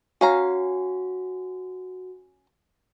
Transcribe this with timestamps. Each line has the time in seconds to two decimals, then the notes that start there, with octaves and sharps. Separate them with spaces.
0.21 C#4 F#4 F5 A#5